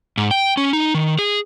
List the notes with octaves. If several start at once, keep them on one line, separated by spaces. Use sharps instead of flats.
G#2
G5
C#4
D#4
D#3
G#4